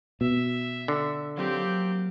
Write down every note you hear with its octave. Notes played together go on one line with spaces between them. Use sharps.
B2 E5
D3
F#3 A#3 C4 F4 G4